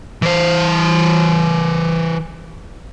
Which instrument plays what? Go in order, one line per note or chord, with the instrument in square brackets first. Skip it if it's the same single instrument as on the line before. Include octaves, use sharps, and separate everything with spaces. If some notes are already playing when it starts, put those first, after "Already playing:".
[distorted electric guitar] E3 C5